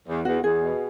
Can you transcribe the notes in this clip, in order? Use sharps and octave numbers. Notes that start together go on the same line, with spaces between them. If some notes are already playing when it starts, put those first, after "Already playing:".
E2
E2 F#4
E2 G#4
B2